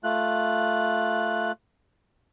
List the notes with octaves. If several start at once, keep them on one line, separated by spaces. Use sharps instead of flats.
A3 F4 F#6